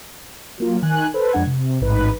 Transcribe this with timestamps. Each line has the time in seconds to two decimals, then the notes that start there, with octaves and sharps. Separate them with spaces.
0.58 F#3 A#3 F4
0.82 D#3 G#5 F#6
1.14 A4 B4 C5
1.33 F2 G#3 D4 F#5 G#6
1.47 C3
1.81 A1 G#2 D#4 B4